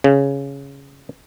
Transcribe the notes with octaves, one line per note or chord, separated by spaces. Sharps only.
C#3